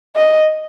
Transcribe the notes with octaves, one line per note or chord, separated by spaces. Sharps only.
D#5